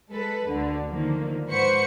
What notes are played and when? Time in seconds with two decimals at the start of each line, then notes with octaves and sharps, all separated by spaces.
0.10 G#3 A4 B4
0.48 D2 D3
0.87 D3 D#3 F3 A#3
1.49 G#2 B4 C5 F#5 C#6 C#7